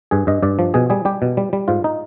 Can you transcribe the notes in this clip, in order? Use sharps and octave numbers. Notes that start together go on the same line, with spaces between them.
G2 G#4
G2 D#5
G2 D5
F3
B2 G#4
G3 G#4
G3 G4
B2
G3
G3
G#2 F4
D#4